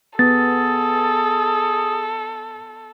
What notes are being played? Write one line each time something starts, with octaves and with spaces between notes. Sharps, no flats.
B3 G#4 A4 A6